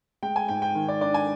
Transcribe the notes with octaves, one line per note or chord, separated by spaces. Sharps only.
G#3 G5
G#5
G#2 G5
G5
D#3
D5
D4 D5
G#5